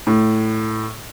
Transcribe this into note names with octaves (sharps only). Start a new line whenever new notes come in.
A2